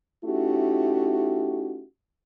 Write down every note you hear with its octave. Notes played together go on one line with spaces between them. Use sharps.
A3 C#4 D#4 E4 F#4 G4